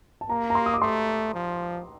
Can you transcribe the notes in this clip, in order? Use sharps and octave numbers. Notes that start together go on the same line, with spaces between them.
A5
A#3 A#5
A#5
C6
D#6
D6
A3 C6
F3